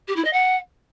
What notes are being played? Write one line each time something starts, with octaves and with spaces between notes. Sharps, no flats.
G4
E4
D#5
F#5